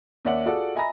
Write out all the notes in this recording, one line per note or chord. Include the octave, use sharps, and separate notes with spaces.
D#2 C#4 D5 E5 F#5 F#7
F4 F#4 G#4 A4 D5 F#5
D#5 E5 G#5 A#5 B5 A#6